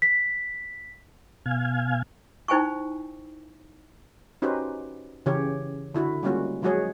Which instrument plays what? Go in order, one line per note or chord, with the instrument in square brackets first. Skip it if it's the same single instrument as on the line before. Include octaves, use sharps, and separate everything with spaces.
[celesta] B6
[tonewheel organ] B2 F5 G#5
[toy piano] D#4 E4 C5 G5 G#5 C#6
[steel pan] C#4 D#4 F#4 G4 B4 C5
C#3 E3 C#4 G4 C#5
D3 E4 F#4
G3 G#3 A#3 C#4 F4 F#4
F3 F#3 G#3 F#4 G#4 C#5